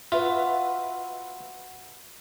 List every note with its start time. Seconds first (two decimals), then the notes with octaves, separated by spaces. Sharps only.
0.12 F4 F#4 B4 E5